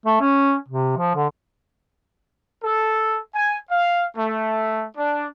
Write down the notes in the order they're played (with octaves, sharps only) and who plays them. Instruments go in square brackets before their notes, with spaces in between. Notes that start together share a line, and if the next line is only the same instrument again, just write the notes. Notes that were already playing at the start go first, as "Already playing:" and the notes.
[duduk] A3
C#4
C3
F3
D3
[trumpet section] A4
G#5
F5
A3
D4